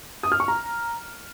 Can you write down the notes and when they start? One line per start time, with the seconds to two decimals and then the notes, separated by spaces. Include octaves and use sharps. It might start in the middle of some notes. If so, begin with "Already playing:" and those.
0.23 D#6
0.32 F6
0.40 C#6
0.48 A#5